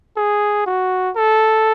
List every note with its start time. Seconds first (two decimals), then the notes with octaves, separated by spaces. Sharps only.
0.17 G#4
0.67 F#4
1.16 A4